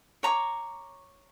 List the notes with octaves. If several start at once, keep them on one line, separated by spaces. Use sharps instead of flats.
C#5 A#5 C#6 D6